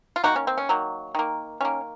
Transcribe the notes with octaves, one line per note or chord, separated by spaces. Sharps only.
F4
D#3 F#3 A#3 D#4 F#4
C#4
C4
C#4
D#3 F#3 A#3
D#3 A#3
D#3 A#3 C#4